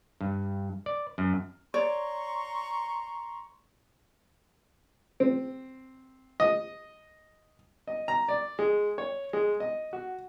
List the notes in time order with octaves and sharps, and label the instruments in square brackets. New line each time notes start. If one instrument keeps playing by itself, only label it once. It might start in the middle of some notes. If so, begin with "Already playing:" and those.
[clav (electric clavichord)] G2
D5
F#2
[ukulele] C#5 D5 [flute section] A#5 C6 C#6
[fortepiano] C4
D#5
D#5
A#5
D5
G#3
C#5
G#3
D#5
F#4